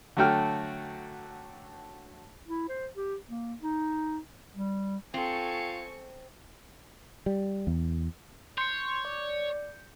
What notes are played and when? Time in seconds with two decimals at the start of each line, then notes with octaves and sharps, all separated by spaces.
0.17 D3 F#3 A3 F#4 G5 F6
2.46 E4
2.69 C5
2.96 G4
3.28 A#3
3.62 D#4
4.55 G3
5.14 C4 F4 A4 G5 G#5 C#6 C#7
7.26 G3
7.67 E2
8.58 C#5 C6 G6 C#7
9.05 D5